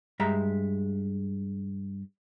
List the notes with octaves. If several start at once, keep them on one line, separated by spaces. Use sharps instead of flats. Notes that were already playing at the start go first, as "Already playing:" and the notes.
G2 G#3 E5 A#5